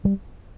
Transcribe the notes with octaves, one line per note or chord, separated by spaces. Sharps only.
G3